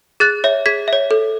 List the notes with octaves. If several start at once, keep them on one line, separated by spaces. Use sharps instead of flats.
G#4 F#6 A6
C#5 E5
G#4 G#6 B6
C#5 E5
A4